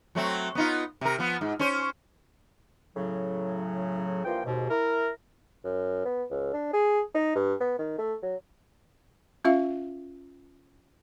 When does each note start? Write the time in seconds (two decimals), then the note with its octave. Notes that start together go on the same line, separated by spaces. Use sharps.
0.15 F#3 A3 C4
0.55 B3 D#4 F4
1.01 C3 A#4
1.18 F3 B3
1.41 G#2
1.59 C#4 C5
2.97 A2 C#3 F#3
4.25 G2 E3 F3 A#3 F4 G5
4.46 D#2 G#2 B2
4.70 E4 A#4
5.64 F#2
6.05 B3
6.30 C#2
6.53 D4
6.73 G#4
7.15 D#4
7.35 G2
7.60 B3
7.79 D#3
7.99 A3
8.23 F#3
9.45 C#4 F4 E5 F5